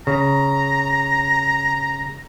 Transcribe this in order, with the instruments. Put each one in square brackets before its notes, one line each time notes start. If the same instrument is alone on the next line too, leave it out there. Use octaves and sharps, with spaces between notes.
[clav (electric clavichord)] C#3 [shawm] A#5